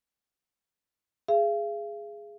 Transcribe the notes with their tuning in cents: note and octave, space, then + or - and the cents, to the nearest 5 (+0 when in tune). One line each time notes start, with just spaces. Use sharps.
G#4 +0 F5 -40